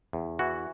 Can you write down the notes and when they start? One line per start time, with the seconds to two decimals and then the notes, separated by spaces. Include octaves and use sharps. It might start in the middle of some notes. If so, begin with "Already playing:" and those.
0.13 E2
0.39 E3 F#4